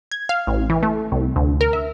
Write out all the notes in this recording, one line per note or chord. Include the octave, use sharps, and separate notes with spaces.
G#6
F5
A1
E3
A3
C2
D2
A#4
E5